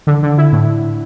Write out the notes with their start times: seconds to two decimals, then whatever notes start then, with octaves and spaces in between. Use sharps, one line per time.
0.07 D3
0.23 D3
0.38 E4
0.52 A2